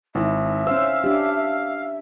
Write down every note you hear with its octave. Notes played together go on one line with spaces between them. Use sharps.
G#1 D#4 E4 E5
C#4 C5 F5 E6
D4 G4